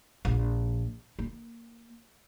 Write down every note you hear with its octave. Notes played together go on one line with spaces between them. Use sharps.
A#1
A#3